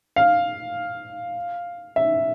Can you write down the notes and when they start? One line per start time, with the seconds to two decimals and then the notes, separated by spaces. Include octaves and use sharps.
0.16 F5
1.96 E5